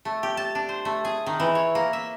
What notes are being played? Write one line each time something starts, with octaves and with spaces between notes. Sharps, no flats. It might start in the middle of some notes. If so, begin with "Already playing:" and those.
A3
G4
A5
D4
C5
A3
G#4
D#3
E3
C#5
A#3
E5